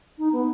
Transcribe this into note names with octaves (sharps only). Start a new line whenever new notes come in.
D#4
B3